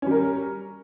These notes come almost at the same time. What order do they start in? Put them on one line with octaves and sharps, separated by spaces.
C#4 G3 A#4